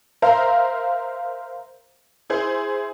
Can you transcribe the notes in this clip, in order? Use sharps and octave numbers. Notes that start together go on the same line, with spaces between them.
A#4 C5 E5 F5 A#5
E4 G#4 C5